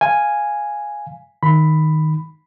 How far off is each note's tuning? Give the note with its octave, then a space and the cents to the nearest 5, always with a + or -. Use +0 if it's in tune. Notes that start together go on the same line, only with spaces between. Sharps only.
F5 +0 G#5 +0
D#3 +0 B5 +5